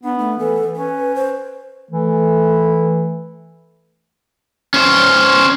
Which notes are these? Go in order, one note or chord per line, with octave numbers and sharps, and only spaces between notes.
B3 D4
A3
E3 A4
C#4 B4
C5
E3 A3
C#4 C5